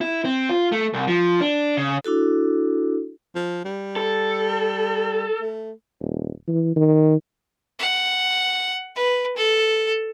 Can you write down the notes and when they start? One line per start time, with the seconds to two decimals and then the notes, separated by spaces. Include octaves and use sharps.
0.01 E4
0.25 C4
0.49 F4
0.72 A3
0.94 C2
1.08 F3
1.41 D4
1.77 C#3
2.04 D4 E4 F#4 A4
3.35 F3
3.65 G3
3.96 A4
5.42 A3
6.01 D#1
6.48 E3
6.76 D#3
7.79 F#5
8.96 B4
9.37 A4